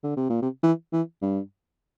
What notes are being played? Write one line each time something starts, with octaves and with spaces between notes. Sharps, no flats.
D3
C3
A#2
C3
E3
E3
G2